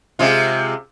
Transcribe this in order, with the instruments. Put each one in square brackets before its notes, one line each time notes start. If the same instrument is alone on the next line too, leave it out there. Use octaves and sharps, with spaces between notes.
[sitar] C3 G#3 F4